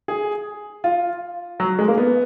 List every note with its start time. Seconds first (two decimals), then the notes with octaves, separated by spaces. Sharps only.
0.08 G#4
0.84 F4
1.60 F#3
1.79 G#3
1.88 A#3
1.98 B3